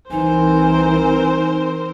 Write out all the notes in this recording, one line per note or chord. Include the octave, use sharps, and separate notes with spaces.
C2 E3 C4 D#4 A#4 C5 G#5